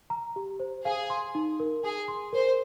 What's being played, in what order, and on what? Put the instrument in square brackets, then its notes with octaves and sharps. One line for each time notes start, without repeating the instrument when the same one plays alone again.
[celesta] A#5
G4
C5
[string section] G#4 [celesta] F5
[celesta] C6
D#4
A#4
[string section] G#4 [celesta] G#5
[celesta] C6
[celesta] A#4 [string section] C5